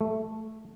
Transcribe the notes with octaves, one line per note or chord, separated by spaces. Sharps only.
A3